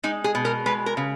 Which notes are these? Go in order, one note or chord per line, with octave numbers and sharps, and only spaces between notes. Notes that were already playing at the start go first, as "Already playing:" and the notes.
G#3 D#4
G#4
B2
A#4
G#3 B4
A#4
C#3